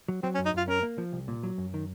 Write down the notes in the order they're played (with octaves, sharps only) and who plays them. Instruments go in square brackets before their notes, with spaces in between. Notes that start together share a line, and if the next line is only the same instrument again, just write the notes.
[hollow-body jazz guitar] F#3
[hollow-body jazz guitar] F#3 [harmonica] C4
[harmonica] C#4
[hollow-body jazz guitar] F#2
[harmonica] D#4
[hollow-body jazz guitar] F#2 [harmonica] F4
[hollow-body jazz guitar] C#4 [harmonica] A#4
[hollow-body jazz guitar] A#3
F3
C2
A#2
F#3
F#2
D#3